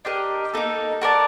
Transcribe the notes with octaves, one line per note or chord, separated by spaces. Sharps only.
D4 G4 A#4 D#5
A#3 D#4 A4
F#4 A#4 D5 A5